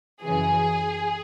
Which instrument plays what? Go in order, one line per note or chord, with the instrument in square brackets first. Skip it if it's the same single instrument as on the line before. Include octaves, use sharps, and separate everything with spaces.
[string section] F#2 C#3 E3 G#4